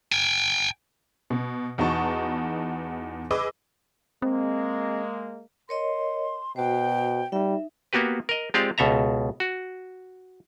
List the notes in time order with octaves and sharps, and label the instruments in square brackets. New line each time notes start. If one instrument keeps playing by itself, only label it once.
[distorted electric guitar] G5 G#5
[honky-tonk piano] B2
E2 B3 D#4 F#4 A5 C#6
G#4 B4 D#5 D6 E6
[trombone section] G#3 A#3 [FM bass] C4
[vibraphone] A#4 C#5 D#5 [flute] C6
[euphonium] B2 [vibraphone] F#4 C5 [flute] G5
[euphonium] G3 [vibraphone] D#4 E5
[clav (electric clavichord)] A#3 B3 F#4 G4 B4
A#4 D#5
G#3 C4 F4 G4 D5 F5
C#2 B2 A4 E5 A#5
F#4